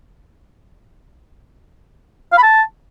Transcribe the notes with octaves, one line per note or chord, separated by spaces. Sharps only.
F5
B5
A5